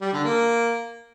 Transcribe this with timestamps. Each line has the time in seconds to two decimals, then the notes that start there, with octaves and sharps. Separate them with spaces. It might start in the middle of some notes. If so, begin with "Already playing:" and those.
0.01 G3
0.13 D3
0.24 A#3